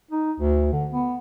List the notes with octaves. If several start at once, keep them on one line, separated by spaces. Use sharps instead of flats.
D#4
D2
D3
B3